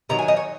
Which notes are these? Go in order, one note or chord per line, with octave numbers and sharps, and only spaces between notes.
C3 D#3 F#3 A#5
G#5
D#5
C#5